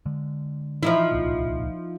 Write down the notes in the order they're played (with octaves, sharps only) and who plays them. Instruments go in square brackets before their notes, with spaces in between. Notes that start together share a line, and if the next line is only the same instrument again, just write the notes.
[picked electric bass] D3 G#3
[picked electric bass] E3 [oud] F3 D#4 E4
[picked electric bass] D1 C2 A#2